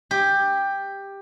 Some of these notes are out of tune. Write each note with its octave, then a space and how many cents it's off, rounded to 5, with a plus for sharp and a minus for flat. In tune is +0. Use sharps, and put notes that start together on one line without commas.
G4 +10